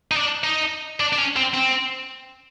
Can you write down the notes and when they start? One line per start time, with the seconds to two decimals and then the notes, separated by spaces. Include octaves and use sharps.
0.11 D#4
0.16 D4
0.44 D#4
1.00 D4
1.13 D4
1.18 C#4
1.36 C4
1.54 C4